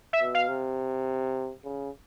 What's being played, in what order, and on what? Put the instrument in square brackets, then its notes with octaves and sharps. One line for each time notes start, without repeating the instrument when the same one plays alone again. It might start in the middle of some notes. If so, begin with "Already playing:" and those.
[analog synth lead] E5
[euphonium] B2
[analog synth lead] F5
[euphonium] C3
C#3